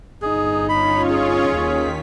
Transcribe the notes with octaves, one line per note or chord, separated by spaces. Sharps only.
G1 D#4 G#4
C#4 F4 C#5 B5
G#4
D#2 D#3 B6